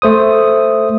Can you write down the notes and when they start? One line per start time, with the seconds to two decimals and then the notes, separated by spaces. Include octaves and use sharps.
0.02 A3 C5 D#6